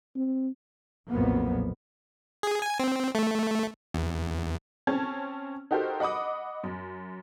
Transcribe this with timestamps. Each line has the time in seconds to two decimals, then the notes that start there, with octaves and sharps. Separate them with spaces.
0.16 C4
1.10 B1 F2 A#2 F#3 A#3 B3
2.43 G#4
2.62 G#5
2.80 C4
3.15 A3
3.94 E2
4.87 C4 C#4 A5 G#6
5.71 D#4 F#4 G4 A4 A#4 C5
6.00 D#5 F#5 B5 D6 D#6
6.63 F#2